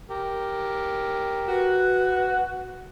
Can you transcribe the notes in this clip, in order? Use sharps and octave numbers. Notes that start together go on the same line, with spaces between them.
G4 A#4
F#4 B4